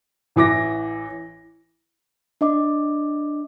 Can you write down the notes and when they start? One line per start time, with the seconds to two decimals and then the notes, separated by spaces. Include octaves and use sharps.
0.36 A1 E3 D6 A#6
2.41 D4 D#5 D6